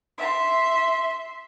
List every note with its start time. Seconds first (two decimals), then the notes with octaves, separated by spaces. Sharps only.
0.18 E5 C6